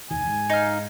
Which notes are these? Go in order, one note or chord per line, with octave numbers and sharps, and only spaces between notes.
F1 D#2 D#3 G#5
G#2
D#4 F5